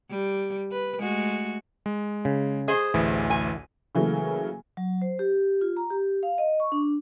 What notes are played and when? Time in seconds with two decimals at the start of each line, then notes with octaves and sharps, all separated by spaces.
0.10 G3
0.71 B4
1.00 G#3 A3 F#4
1.86 G#3
2.25 C#3
2.68 G#4 C5 D#5
2.94 A1 D2 E3
3.30 G#5
3.95 C#3 E3 F#3 A3 A#3
4.77 F#3
5.02 C5
5.19 G4
5.61 F4
5.77 A#5
5.91 G4
6.23 F5
6.38 D#5
6.60 C#6
6.72 D4